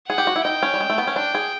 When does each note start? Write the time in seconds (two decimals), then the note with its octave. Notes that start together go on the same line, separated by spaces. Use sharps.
0.09 G#4 F#5
0.18 G4
0.27 F#4
0.36 E4
0.45 D#4 G5
0.63 C#4
0.74 G3
0.80 G#3
0.90 A3
0.98 B3
1.07 C#4
1.16 D4 G5
1.35 G#4